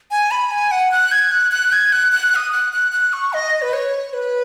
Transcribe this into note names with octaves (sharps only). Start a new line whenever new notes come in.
G#5
B5
G#5
F#5
F#6
G#6
F#6
F#6
G#6
F#6
F#6
F#6
D#6
F#6
F#6
F#6
C#6
D#5
B4
C#5
B4